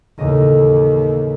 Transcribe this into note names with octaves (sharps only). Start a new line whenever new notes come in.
A1 D#2 C#3 D#5